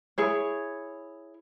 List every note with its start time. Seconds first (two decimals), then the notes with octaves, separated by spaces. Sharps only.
0.18 E4 G#4 C#5